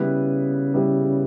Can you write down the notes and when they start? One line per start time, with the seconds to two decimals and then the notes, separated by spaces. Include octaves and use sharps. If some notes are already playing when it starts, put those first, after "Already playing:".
Already playing: C#3 G3 B3 E4 B4
0.74 G3 B3 E4 B4